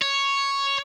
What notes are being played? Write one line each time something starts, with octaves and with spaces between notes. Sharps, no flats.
C#5